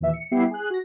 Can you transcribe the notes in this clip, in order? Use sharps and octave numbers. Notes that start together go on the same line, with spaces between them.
D#2 A#2 E3 E5
C#7
G3 B3 E4 G4 C7
G#4 F#6
F#4 A#6